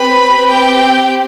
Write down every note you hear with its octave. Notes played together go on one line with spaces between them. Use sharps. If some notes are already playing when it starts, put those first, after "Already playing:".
Already playing: C4 G4 B4 B5
G4 G5